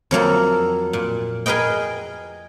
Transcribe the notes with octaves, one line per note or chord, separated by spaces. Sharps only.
F2 F#3 A#3 A4
A#2
G#4 A#4 B4 D#5 G5